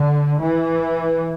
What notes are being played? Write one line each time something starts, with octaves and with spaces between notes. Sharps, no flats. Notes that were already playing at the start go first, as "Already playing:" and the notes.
Already playing: D3
E3